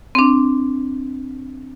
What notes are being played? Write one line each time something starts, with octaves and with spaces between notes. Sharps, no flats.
C4 D4